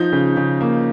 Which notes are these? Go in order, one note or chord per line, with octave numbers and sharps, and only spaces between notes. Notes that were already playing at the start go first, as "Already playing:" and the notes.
Already playing: F3 D#4 G6
C#3
C#3
A#3